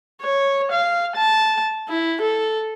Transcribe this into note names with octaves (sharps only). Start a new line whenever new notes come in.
C#5
F5
A5
E4
A4